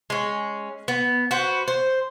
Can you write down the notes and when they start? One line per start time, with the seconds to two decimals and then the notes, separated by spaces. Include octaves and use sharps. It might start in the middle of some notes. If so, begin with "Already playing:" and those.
0.10 G#3 C#4
0.88 B3
1.31 F#4 B4 C5
1.68 C5